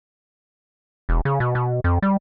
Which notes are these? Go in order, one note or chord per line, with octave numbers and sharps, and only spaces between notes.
E1
C#3
B2
B2
F2
G3